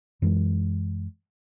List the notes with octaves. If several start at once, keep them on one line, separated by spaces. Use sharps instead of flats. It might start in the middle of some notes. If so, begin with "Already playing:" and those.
F#2 E3 G#3